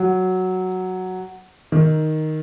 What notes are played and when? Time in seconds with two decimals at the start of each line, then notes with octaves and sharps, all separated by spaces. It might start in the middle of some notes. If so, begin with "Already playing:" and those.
Already playing: F#3
1.72 D#3